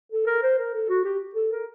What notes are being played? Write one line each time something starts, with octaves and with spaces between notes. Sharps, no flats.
A4
A#4
C5
A#4
A4
F#4
G4
A4
A#4